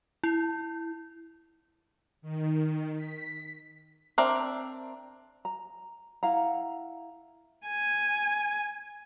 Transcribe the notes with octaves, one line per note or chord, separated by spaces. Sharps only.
E4
D#3
B6
C4 D4 A#4 D5 E5
A#5
E4 F5 F#5 A#5
G#5